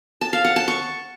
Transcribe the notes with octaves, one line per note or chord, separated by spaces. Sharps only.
A5
F5
F#5
A5
C#6